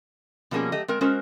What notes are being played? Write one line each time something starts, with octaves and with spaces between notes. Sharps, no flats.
B2 F3 G3 A#3 C#4 G#4
F#3 A3 G4 D#5
G#3 C4 A#4
G#3 C#4 F#4 A#4 C5